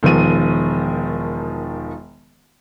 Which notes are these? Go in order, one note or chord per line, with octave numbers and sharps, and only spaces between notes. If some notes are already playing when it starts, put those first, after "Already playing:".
E1 D#3 F3 D#7